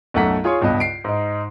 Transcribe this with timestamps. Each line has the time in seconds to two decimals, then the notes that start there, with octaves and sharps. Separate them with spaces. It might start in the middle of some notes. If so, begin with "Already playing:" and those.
0.14 B1 F#2 A3 F#5 A#5 B6
0.44 F4 G#4 C#5 C6 C#6
0.61 C#2 G2 B2 D#5
0.80 C7 D7
1.04 G#2 D#4